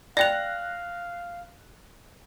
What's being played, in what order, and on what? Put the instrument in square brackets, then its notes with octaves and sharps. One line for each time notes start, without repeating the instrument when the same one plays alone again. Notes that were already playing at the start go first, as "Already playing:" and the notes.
[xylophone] D5 G5 F7 [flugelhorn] F5 [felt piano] F#6 A#6